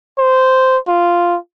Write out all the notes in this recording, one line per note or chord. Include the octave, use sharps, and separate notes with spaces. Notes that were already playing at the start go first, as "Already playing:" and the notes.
C5
F4